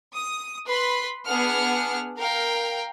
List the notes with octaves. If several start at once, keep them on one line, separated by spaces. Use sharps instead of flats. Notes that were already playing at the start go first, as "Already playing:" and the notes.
D#6
B4 B5 C6
B3 D4 G#4 F#5 F6
A#4 F5 G5